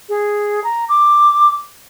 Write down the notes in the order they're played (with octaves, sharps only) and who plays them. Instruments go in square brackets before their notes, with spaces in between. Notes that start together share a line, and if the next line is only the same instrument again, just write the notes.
[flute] G#4
A#5
D6